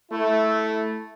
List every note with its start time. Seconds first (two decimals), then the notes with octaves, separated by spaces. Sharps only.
0.11 A3 E4